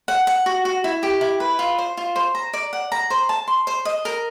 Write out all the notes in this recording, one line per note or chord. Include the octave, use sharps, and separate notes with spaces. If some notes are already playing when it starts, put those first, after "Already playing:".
F#5
F#5
F#4
F#4
E4
G4
E4
B4
F4
C5
F4
C5
A#5
D5
F#5
A#5
C5
A5
C6
C5
D#5
A#4